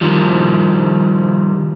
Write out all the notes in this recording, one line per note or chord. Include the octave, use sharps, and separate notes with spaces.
D#3 F3 G3